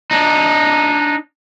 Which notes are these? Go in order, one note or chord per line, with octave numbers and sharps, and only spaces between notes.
D4 D#4